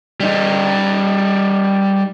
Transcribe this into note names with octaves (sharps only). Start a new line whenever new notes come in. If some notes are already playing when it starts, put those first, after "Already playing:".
G3 D#4